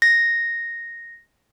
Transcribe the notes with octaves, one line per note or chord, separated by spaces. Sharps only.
A#6